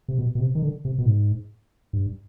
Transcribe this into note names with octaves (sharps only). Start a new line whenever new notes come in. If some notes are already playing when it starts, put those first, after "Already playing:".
C3
B2
B2
C3
D#3
D3
C3
B2
G#2
G2